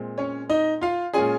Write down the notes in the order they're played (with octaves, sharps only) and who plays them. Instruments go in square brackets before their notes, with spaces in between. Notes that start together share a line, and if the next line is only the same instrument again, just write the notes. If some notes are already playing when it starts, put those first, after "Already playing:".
Already playing: [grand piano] A#2 G#3 C4
C#4 C#5
D#4 D#5
F4 F5
A#2 G#3 C#4 F4 G#4 G#5